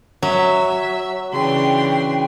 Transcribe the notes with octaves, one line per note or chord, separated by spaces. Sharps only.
F#3 E5
C#3 E3 D4 G5 C6